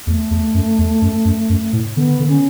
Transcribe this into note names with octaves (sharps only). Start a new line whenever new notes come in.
E2 A3
E2
F#2
E2
F#2
F#2
F#2
A2
D3 B3
D3
C#4